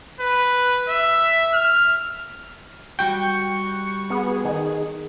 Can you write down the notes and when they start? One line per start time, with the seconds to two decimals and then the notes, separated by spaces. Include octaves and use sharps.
0.21 B4
0.89 E5
1.54 F6
2.99 G3 F#4 G5 C#6
4.10 B3 G#4
4.45 D#3